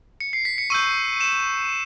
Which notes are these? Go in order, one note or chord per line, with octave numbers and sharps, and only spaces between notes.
C#7
C7
B6
C#7
C#6 E6 G6 D#7
E7